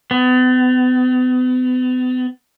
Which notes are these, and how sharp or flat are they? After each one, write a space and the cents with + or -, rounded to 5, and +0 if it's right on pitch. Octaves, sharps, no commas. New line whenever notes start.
B3 +40